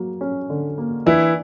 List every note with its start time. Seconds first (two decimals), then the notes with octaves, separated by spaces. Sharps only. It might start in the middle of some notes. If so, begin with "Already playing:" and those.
Already playing: F#3 A#3
0.21 C#4
0.50 D3
0.78 A#3
1.06 E3 D4 E4